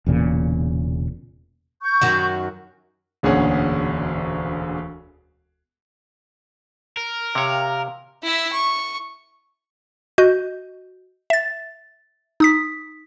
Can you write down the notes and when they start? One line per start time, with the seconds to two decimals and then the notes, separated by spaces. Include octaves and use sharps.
0.06 E1 E2 A#2 C#3
1.82 C#6 G6
2.01 F#2 D#3 F#3
3.23 E1 D2 A#2 C#4 G#4 F#5
6.97 A#4
7.35 C3 G4 C#5 F5
8.23 E4 E5
8.52 C#6
10.18 F#4 D#5 G6
11.30 E5 A6
12.40 D#4 D#6 B6